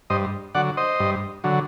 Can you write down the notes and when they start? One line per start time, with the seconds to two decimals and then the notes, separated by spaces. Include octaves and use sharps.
0.10 G2 C5 D#5
0.55 D3 F#3 D5 F#5
0.77 C5 D#5
1.00 G2
1.44 D3 F#3